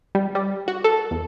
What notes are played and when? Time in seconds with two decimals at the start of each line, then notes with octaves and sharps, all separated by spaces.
0.15 G3
0.35 G3
0.68 F#4
0.84 A4
1.11 E2